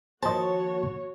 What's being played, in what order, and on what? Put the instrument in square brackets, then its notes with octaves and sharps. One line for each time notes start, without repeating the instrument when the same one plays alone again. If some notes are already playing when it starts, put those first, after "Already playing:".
[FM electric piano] D#3 F3 A#3 [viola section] F#4 C#5 [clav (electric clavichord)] C5 D#5 [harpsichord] A5